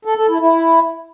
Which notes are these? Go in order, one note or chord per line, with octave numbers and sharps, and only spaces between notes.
A4
A4
E4
E4